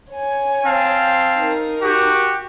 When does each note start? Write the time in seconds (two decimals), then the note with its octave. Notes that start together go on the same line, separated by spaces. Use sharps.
0.12 C#5 G#5
0.65 C4 F5 A5
1.39 D#4 A#4
1.82 F#4 G4